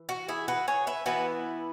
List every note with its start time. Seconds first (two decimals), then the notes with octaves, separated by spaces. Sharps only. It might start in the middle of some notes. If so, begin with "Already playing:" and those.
Already playing: E3
0.09 F#4
0.28 E4 G#4
0.48 F#4 B4
0.68 G#4 C#5
0.87 B4 E5
1.06 E3 B3 E4 F#4 B4